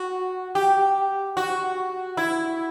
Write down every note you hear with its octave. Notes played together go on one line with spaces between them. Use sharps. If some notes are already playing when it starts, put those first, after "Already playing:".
Already playing: F#4
G4
F#4
E4